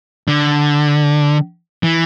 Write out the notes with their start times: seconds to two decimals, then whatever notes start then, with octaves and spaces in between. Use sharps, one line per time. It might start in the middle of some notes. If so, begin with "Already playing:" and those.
0.28 D3
1.83 E3